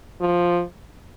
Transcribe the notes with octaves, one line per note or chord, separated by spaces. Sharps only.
F3